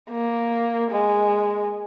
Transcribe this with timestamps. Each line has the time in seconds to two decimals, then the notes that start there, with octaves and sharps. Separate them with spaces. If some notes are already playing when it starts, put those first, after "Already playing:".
0.11 A#3
0.91 G#3